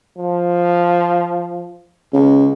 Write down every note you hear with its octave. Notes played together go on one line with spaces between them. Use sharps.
F3
C#2 C#3